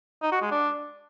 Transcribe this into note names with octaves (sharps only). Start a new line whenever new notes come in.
D#4
F#4
G#3
D4